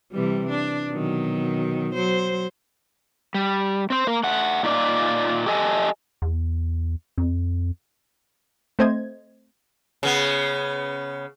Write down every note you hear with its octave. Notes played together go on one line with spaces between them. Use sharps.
C3 E3 G3
D4
B2 D#3 F#3
F#3 C5
G3
C4 C5
A#3 A#4
A3 F#5
A#2 D#4 F4 C5 D5
G4 A4 D#5 G#5 A5
E2
F2
A3 C4 C5 D#5 G#6
C#3 B3